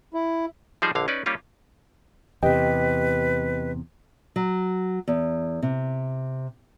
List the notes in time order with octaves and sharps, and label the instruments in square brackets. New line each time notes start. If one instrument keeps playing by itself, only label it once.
[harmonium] E4
[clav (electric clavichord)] F3 G3 D#4 G#4 C5
A#1 D3 F5
C#4 D#4 B4 D5
G3 A#3 C#4 F4 G4
[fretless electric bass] E2 C3 [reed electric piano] G4 D#5 G5 [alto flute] B4
[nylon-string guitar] F#3
E2
C3